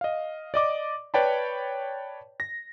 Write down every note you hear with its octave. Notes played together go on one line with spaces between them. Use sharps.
D#5 F5
D5 D#5 D6
B4 C#5 D5 G5 A5 B5
A#6